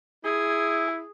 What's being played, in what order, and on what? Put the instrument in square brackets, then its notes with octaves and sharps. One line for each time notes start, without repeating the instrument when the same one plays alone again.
[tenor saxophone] E4 [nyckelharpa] G#4